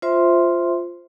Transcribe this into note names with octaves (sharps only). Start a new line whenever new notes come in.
F4 C5 E5 C6